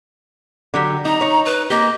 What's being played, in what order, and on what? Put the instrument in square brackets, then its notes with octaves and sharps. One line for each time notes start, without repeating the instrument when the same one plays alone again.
[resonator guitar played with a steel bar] D3 F#3 G4
[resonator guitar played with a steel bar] D#4 [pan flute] A#5
[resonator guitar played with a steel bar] D#4 C#5
[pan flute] B4
[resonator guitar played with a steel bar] A#3 G4 [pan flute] D#5